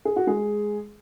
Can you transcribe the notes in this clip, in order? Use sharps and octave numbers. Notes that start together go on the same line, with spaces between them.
G#4
F#4
G#3 G#4